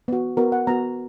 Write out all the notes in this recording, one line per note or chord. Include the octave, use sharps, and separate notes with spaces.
B3 F#4
B3 F#4 A#4
F#5
B3 F#4 A#5